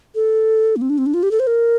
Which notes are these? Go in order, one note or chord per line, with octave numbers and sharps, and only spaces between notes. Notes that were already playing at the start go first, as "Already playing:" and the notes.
A4
A#3
C4
D4
C4
D4
F4
G4
A4
C5
A#4